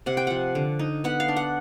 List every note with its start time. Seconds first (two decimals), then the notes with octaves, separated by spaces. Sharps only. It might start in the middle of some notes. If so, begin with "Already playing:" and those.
0.06 C3 F#5
0.17 G5
0.27 F3 F#5
0.55 D3
0.79 D#4
1.04 B3 F#5
1.20 F5
1.28 D4
1.36 F#5